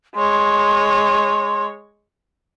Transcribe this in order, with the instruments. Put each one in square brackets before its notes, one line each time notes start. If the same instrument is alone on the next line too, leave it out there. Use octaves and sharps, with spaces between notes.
[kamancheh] G#3 C#5 [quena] C6